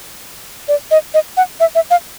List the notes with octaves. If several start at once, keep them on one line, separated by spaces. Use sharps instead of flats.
D5
D#5
D#5
F#5
E5
E5
F5